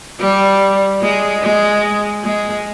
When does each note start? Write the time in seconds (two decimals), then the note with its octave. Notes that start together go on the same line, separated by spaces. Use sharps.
0.20 G3
1.02 G#3
1.43 G#3
2.24 G#3